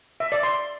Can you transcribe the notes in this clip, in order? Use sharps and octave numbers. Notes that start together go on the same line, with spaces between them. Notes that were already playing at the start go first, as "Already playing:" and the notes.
E5
D5
C6